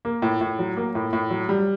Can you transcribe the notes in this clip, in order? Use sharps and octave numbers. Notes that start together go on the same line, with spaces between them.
A#3
A2
A2
F#3
A#3
A2
A2
F#3
G3